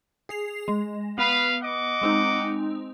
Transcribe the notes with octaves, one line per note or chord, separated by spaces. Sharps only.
G#4 C7 F7
G#3
B3 B4 F5
D#5 F#5 D6
G#3 C4 D#4